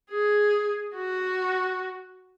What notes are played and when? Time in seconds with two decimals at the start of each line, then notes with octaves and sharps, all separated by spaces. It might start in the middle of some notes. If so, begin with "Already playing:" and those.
0.10 G#4
0.95 F#4